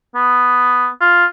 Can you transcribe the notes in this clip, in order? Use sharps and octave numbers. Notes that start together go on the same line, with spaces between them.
B3
F4